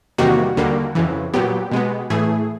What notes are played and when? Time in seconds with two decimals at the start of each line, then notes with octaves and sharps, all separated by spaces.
0.18 E2 C3 D#3 G3 A#3 F#4
0.57 D#2 D3 G3 A#3
0.95 F2 C#3 E3
1.33 A#2 F#3 B3 G4
1.71 B2 G#3 B3
2.10 A2 E3 A3 G#4